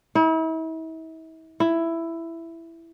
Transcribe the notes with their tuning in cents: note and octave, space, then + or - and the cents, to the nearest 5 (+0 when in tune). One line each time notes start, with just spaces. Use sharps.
E4 -40
E4 +10